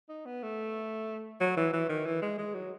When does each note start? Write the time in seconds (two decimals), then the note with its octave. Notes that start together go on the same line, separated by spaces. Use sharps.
0.09 D#4
0.26 B3
0.43 A3
1.40 F#3
1.57 E3
1.73 E3
1.89 D#3
2.06 E3
2.22 G#3
2.38 G#3
2.55 F#3